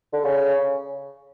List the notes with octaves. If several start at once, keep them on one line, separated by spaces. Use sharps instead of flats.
D3
C#3